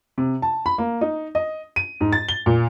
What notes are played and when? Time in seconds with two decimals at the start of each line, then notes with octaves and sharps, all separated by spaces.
0.18 C3
0.42 A5
0.66 B5
0.78 A#3
1.01 D#4
1.35 D#5
1.76 D#7
2.01 G#2
2.13 A6
2.29 G7
2.46 A#2